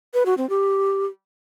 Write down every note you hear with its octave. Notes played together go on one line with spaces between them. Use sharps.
B4
F#4
C4
G4